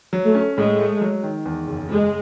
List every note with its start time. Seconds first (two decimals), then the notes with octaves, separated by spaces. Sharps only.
0.13 F#3
0.24 A3
0.35 C#4
0.57 A2 G#3
0.79 A3
1.01 F#3
1.23 D#3
1.46 E2
1.67 F#1
1.89 F#1 G#3